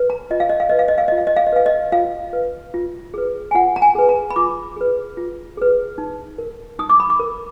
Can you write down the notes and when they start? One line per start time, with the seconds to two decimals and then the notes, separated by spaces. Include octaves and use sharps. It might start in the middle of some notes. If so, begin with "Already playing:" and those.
Already playing: B4
0.10 A#5
0.31 F4 D#5
0.40 F5
0.50 D#5
0.60 F5
0.69 B4 D#5
0.79 F5
0.88 D#5
0.98 F5
1.08 F4 D#5
1.18 F5
1.27 D#5
1.36 F5
1.47 D#5
1.52 B4 F5
1.66 D#5
1.92 F4 F5
2.33 B4
2.74 F4
3.14 G#4 B4
3.51 G#5
3.55 F4 F#5
3.76 A#5
3.82 G#5
3.95 G#4 B4
4.09 A#5
4.30 B5
4.36 F4 D6
4.77 G#4 B4
5.17 F4
5.57 G#4 B4
5.98 D#4
6.38 A#4
6.79 D#4 D#6
6.90 D6
7.00 B5
7.10 D6
7.19 A#4